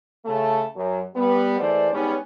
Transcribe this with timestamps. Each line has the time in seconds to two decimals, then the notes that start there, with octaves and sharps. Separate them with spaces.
0.25 C#3 A3 A5
0.76 F#2 F#3
1.15 G3 B3
1.59 E3 G#3 A3 C5 D5
1.92 G#2 G3 B3 C#4